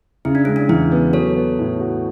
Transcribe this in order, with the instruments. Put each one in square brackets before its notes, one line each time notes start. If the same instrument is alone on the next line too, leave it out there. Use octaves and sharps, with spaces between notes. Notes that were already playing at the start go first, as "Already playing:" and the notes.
[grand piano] C#3 [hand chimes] E4
[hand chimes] D4
[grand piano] G#3 [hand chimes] C#4
[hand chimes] D4
[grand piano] E2 [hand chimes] E4
[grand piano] B3
[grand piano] F#3 [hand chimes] A4 C#5
[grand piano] B3
A2
F#4